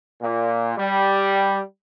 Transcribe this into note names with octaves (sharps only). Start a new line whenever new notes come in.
A#2
G3